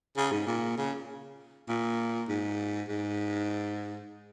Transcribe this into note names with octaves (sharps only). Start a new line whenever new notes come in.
C#3
G#2
A#2
C#3
A#2
G#2
G#2